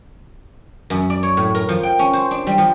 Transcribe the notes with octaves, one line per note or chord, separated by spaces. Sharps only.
F#2
D5
C#5
A2
A#4
F3
G5
C#4
C5
D4
G3
F3